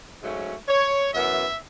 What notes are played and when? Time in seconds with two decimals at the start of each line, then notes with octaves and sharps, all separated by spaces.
0.22 G#2 F#3 A3 C#4
0.68 C#5
1.13 F#2 E3 B3 E5